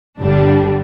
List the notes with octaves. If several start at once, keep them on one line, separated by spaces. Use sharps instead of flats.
G1 G2 D3 G3 D4